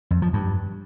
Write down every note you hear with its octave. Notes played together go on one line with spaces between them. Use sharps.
F2
F3
G2